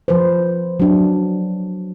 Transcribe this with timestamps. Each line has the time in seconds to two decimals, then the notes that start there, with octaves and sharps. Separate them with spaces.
0.08 F3 B4 C5
0.80 F#3 D4